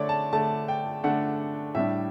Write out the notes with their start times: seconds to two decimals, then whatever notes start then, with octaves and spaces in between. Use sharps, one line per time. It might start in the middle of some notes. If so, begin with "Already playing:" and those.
Already playing: D3 A3 D4 C#5 D5
0.09 A5
0.33 D3 A3 D4 A5
0.68 G5
1.04 D3 A3 D4 F#5
1.75 A2 G3 D4 E5